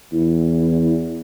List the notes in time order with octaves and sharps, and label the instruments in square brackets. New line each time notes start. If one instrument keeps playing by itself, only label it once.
[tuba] E2 [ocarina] E4